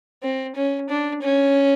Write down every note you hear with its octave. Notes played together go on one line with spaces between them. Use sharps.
C4
C#4
D4
C#4